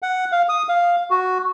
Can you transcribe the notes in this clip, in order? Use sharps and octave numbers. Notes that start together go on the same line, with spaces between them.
F#5
F5
D#6
F5
F#4